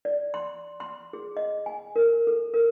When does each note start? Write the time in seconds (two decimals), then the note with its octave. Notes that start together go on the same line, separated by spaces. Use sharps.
0.05 D5
0.34 C6
0.80 C6
1.13 G#4
1.37 D#5
1.66 G#5
1.96 A#4
2.27 A4
2.54 A#4